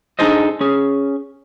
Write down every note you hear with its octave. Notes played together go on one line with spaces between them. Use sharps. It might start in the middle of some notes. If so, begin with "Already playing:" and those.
D4 D#4 G#4 A4 C5 D#5
C#4 G#4